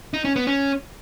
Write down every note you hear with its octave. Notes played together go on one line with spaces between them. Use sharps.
D#4
C#4
B3
C#4